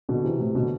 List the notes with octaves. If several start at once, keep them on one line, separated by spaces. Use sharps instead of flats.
B2 D3
C3 E3
A2 C3
B2 D3